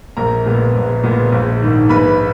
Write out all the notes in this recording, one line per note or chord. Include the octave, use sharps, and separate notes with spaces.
A#1 A#4 A#5
A#2 G#3 B3
A#1
A#2 G#3 B3
A#1
G#2 D#3
A#1 B4 B5